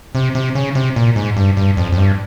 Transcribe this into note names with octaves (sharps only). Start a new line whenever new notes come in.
C3
C3
C#3
C3
A#2
G#2
G2
G2
F2
F2
G2